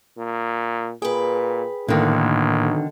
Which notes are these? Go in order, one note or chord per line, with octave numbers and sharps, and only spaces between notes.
A#2
A#2 G#4 B4 G5
B1 A2 D3 D#3 A#3